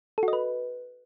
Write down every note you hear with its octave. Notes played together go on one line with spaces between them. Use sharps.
A4
F#4
D#5
B4